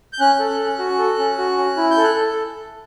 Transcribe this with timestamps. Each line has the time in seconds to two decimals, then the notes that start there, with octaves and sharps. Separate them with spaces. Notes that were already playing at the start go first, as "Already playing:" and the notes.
0.13 G6
0.20 C#4 F#6
0.39 A4
0.60 C#4
0.79 F#4
0.99 A4
1.19 C#4
1.38 F#4
1.58 C#4
1.77 E4
1.91 G6
1.97 A4
2.04 F#6
2.17 A4